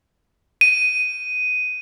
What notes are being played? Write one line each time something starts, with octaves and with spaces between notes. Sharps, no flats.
D#7